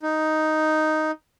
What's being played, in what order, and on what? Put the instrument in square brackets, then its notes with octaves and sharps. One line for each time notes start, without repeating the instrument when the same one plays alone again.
[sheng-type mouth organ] D#4